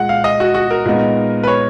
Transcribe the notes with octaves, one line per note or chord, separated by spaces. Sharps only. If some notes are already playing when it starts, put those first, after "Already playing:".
Already playing: A#2 G#3 F#5
F5
D#5
F#4
F#4
A#4
A#2 G#3 B3 D#4
B4
C#5